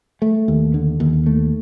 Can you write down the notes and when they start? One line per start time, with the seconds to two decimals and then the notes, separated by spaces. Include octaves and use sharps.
0.22 A3
0.48 D#2
0.74 D3
1.00 D#2
1.26 A3